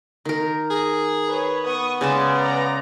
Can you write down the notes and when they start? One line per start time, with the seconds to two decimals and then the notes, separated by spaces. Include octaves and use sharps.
0.25 D#3 A#4
0.70 G#4
1.27 B4 C#5
1.67 B3 C#6 D#6
2.01 C#3 G#3 D5 G#5 A5
2.38 D5 A#5